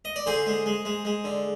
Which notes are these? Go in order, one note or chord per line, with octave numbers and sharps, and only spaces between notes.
D#5
D5
D3 G#4 C5
G#3
G#3
G#3
G#3
D3